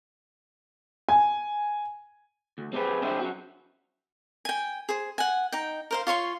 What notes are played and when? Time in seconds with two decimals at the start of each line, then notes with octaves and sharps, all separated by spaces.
1.09 G#5
2.58 D2
2.73 C4 G4 G#4 B4
3.02 C4 D4 E4 G4 G#4 C5
3.19 C#4 F#4
4.45 G5 G#5
4.89 G#4 C5
5.18 F#5 G#5
5.52 D#4 G5
5.91 A#4 C5 F5
6.07 F4 C#5 C6 C#6